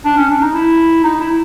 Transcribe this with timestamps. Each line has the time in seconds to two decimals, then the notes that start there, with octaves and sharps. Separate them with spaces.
0.05 D4
0.17 C#4
0.29 D4
0.42 D#4
0.54 E4
1.04 D#4
1.20 E4